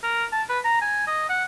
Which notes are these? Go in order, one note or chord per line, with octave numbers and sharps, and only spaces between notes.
A#4
A5
B4
A#5
G#5
D#5
F#5